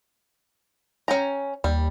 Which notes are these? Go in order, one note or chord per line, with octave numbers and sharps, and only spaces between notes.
C#4 G5 A#5
D#2 G3